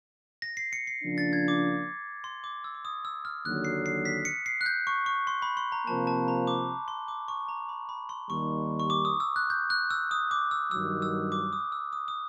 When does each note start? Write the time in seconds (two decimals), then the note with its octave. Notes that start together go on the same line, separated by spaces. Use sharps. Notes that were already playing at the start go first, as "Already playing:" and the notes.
0.42 A#6
0.57 C7
0.73 C#7
0.87 C7
1.03 C#3 F3 A#3 D4
1.18 A6
1.33 G#6
1.48 D6
2.24 C6
2.44 D6
2.64 E6
2.75 D6
2.85 D#6
3.05 E6
3.25 F6
3.45 D#2 D3 F#3 F#6
3.65 C7
3.86 C7
4.05 B6
4.25 C#7
4.46 C7
4.61 F#6
4.66 G6
4.87 C#6
5.06 C#6
5.27 C6
5.42 B5
5.57 C6
5.72 A#5
5.87 C3 F3 A#3 A5
6.07 A5
6.28 A#5
6.47 D6
6.88 C6
7.08 D6
7.28 C#6
7.48 A#5
7.69 B5
7.89 B5
8.09 C6
8.30 D#2 D#3 G3 C#6
8.79 C#6
8.90 D6
9.05 D#6
9.20 E6
9.36 F#6
9.50 G6
9.70 F#6
9.91 E6
10.11 D#6
10.31 D6
10.51 E6
10.71 G2 D#3 F#3 E6
11.02 E6
11.32 D6
11.53 D#6
11.72 E6
11.93 D#6
12.08 D#6